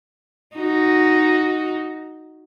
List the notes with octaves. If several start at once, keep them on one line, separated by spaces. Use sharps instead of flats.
D#4 F#4